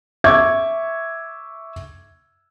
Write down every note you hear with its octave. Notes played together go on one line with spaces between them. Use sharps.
E5 C#6 D6 G#6